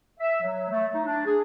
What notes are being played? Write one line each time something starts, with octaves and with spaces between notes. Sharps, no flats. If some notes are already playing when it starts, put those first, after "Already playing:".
E5
F#3
A3
D#4
D4
G#4